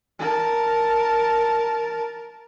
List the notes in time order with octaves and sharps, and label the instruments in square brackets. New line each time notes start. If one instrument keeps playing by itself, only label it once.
[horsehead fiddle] A#4 A5